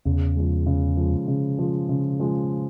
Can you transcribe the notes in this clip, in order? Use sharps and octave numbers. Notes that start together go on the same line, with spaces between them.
E2 C#3
F3 G#3
C#3
F3 G#3
C#3
F3 G#3
C#3
F3 G#3